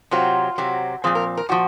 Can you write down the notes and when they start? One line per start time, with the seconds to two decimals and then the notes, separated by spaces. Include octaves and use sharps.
0.11 C3 F#3 C4 F4
0.58 C3 F#3 C4
1.04 A#2 F3 C4 G#4
1.15 A#4
1.37 A#4
1.49 A#2 F3 F#4